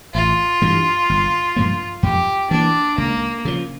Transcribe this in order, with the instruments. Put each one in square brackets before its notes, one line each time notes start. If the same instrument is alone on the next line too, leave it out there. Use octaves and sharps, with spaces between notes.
[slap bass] A1 [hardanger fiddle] F4
[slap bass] G2 E3 G3
G1
G2 F3 A#3
[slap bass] F2 [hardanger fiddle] G4
[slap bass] E3 A#3 [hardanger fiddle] D4
[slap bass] C#2 [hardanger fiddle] A#3
[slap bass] C#3 F3